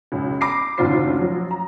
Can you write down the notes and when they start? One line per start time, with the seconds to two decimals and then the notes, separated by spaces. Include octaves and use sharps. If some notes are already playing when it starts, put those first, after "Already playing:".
0.12 C#2 F#2
0.41 B5 D6 A#6 C7
0.78 F#1 D2 D#3 F4 C5 C7
1.19 F3 F#3
1.51 A#5